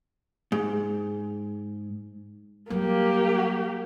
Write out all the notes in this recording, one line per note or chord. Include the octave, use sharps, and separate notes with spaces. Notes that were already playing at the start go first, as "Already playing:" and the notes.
G#2
F#3 G3 A#3 G4